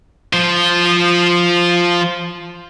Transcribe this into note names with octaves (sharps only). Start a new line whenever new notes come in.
F3 C5